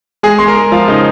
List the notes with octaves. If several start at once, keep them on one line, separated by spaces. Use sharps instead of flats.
G#3 G#4 G#5
G#3 C6
A#4 A#5
G#3
F3 F4 F5
C#3 D#4 D#5